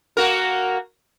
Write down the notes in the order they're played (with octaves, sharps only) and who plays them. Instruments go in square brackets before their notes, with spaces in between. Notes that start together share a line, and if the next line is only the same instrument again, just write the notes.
[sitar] A#3 F#4 A#4